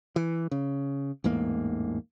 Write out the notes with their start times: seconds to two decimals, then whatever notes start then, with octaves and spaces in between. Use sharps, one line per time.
0.16 E3
0.51 C#3
1.24 A1 E2 G#2 A#3